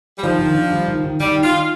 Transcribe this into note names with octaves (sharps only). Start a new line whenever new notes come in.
G3
D#3 F3
D#3
D4
G3
D#3
D#3
D#3 G3
D#4
F4
D#4